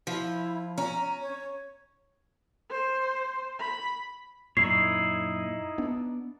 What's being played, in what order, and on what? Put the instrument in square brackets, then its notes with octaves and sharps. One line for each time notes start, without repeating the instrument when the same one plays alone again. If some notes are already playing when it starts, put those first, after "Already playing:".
[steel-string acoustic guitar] F3 [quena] E4
[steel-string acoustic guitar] C#4 [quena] A#5
[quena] C#5
[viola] C5
B5
[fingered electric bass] F#2 A#2 [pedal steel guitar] D#4 E4 C#5 [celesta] C7
[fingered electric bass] B3 D4